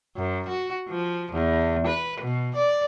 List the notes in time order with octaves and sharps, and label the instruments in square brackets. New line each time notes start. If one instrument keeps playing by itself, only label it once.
[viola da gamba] F#2
F#4
F3
E2
B4
B2
D5